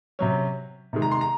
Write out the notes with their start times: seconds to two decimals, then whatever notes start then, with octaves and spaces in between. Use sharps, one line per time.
0.19 C3 F#3 C#4
0.93 C3 D#3 G#3
1.02 A#5
1.12 C6
1.21 A#5